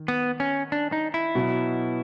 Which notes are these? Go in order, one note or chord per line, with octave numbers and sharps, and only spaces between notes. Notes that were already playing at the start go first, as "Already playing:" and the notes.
Already playing: D#3
B3
C#4
D4
D#4
E4
B2 F#3 B3